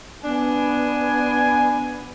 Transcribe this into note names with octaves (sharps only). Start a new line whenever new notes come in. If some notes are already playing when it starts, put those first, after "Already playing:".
B3 D4 G#5